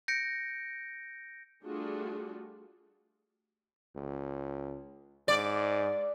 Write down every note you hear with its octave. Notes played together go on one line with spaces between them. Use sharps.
G6 A#6 C#7 D7
G3 A3 D4 F4 F#4 G#4
C#2
G#2 D5